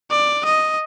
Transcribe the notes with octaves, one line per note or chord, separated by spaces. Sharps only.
D5
D#5